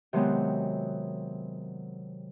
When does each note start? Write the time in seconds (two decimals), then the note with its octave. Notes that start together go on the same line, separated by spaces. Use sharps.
0.13 C3 D#3 F#3 G#3 B3